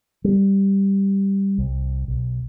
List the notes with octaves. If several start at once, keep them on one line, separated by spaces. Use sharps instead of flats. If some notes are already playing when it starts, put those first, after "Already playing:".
G3
C2
B1